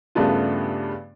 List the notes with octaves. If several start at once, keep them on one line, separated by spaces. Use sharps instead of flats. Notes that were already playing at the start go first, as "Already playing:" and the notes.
G2 C#3 A3 B3 D4 F4